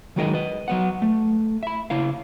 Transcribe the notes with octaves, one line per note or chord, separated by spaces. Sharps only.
D#3 F#3 G#3 D#4 A#4 D#5
B4 D#5
F#3 B3 F#5
A3
E5 B5
C#3 E4 C#5 F5